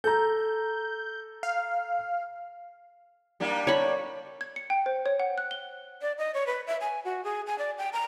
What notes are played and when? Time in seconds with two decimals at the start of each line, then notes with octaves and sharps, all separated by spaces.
0.04 A4 A#5 G6
1.43 F5
3.40 G3 A#3 D4
3.67 C#5 B5
4.41 G#6
4.56 C#7
4.70 G5
4.86 C5
5.06 C#5
5.20 F#5
5.38 F#6
5.51 G7
6.02 D5
6.18 D#5
6.34 C#5
6.47 B4
6.67 E5
6.81 G#5
7.05 F#4
7.24 G#4
7.47 G#5
7.58 D5
7.78 G5
7.93 A#5